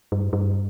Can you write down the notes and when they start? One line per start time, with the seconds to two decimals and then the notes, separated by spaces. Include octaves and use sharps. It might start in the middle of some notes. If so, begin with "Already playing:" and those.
0.12 G2
0.33 G2